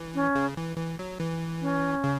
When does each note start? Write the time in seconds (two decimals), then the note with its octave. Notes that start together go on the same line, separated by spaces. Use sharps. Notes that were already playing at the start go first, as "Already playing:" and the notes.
Already playing: E3
0.14 C#4
0.35 C#3
0.57 E3
0.78 E3
0.99 F#3
1.20 E3
1.61 C#4
2.04 C#3